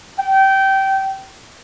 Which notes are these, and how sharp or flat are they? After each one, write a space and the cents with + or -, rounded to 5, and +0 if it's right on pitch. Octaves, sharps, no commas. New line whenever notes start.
G5 -20